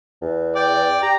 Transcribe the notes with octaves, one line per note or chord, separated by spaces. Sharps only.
E2
D5 G5
G4 A#5